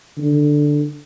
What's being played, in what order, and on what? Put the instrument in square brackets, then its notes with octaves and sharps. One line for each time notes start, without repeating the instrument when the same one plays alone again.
[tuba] D3